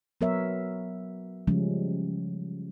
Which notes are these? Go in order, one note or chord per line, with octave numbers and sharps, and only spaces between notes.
F#3 B3 A#4 C#5 E5
C#3 F3 G3 G#3 C#4